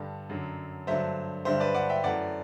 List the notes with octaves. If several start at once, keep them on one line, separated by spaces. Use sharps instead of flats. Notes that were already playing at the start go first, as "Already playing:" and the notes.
Already playing: G2 D3 G3 A4
F#2 D3 F#3
G2 D3 F#3 A3 C5 E5
G2 D3 G3 C5 E5
B4 D5
D5 F#5
E5 G5
F#2 E3 A3 D5 F#5